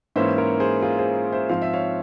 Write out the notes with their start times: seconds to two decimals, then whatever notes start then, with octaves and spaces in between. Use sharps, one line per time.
0.16 G#2 E3 A#3 C#4 C5 E5
0.38 A#4 C#5
0.60 G#4 C5
0.82 F4 G#4
0.99 G#4 C5
1.32 C5 E5
1.49 G#2 F3 C4 F5
1.62 E5
1.74 C#5 F5